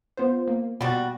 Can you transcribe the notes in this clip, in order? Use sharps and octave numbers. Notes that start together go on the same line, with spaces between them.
B3 F4 C5
A#3
B2 G3 F#4 A6